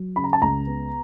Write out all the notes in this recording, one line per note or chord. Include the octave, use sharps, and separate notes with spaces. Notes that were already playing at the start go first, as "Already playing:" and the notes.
Already playing: F#3
C#3 B5
A#5
A5
C#2 A#5
B3